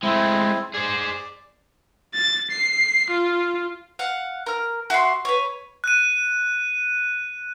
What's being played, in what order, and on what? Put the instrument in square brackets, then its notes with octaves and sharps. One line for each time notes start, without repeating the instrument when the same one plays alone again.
[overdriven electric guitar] G#3 A3 [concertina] C4 E4
[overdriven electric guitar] G#4 C5 [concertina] D5
[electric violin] A6
C7
F4
[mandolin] F5 F#5
A#4 F6
F#4 E5 F#5 C6
B4 C#5
[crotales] F#6 D#7